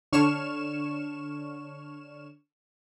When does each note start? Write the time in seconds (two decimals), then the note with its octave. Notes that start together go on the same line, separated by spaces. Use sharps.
0.13 D3 D4 C#5 C#6 F6 E7